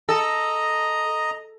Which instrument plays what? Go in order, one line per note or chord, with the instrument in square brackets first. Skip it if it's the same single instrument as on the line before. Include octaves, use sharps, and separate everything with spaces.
[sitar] A4 [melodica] D#5 A#5